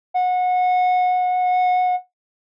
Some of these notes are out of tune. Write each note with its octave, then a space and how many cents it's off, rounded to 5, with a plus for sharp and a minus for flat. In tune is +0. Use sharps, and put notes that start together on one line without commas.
F#5 -25